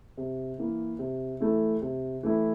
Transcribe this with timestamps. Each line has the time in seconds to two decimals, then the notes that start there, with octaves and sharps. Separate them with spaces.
0.17 C3
0.58 E3 A#3 E4
0.99 C3
1.40 E3 A3 E4
1.82 C3
2.23 E3 A3 E4